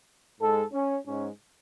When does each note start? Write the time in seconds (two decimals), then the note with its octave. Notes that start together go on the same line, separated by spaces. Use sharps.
0.40 G#2 G#3 A4
0.73 C#4
1.06 G#2 G#3 C#4